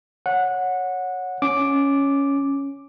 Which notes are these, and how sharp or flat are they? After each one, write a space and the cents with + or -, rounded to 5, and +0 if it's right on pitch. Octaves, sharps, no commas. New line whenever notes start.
C#5 +0 F#5 -15
C#4 +0 D6 +0